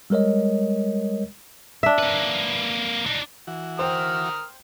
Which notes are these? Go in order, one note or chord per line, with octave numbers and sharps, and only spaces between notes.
G3 G#3 A#4 C#5 D#5
D4 E5
A#3 B4
D4 D#4
E3 F#4
A#4 C5 G5 D#6 F6